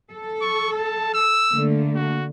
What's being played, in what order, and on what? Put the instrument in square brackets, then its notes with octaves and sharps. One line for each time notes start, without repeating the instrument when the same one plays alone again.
[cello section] A4
[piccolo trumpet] C#6
A5
E6
[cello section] D3 A3 A#3
[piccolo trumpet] F#4